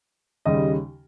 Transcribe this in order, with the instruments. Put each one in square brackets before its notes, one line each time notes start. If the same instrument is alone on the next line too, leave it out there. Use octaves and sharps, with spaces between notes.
[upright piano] D#2 C#3 G3 D#5